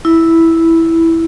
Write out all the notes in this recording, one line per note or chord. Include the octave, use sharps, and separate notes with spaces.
E4